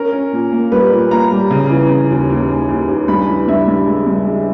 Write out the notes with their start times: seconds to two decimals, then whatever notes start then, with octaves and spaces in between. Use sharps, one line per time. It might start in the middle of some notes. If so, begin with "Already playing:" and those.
Already playing: C#4 A#4
0.12 C#4
0.32 A#2
0.52 A#3
0.72 G3 B4
0.92 A#2
1.11 A#3 A#5
1.31 G3
1.51 C#3
1.70 E3
1.90 C#3
2.10 D#2
2.30 D#2
2.49 D#2
2.69 D#2
2.89 D#2
3.08 G2 B5
3.28 E3
3.48 G2 E5
3.68 G2
3.87 G#3
4.07 G2
4.27 G#3